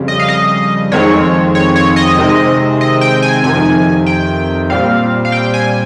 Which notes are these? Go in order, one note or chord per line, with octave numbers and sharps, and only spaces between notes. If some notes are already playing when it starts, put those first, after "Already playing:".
Already playing: F2 C#3 G3
D#5
F5
D#5
F2 D#3 G#3 C4 C#5
C#5
C#5
D#5
C3 D#3 G#3 C4
D#5
G5
G#5
F2 C3 D#3 G#5
G5
A#2 G3 C4 F5
F5
G5
G#5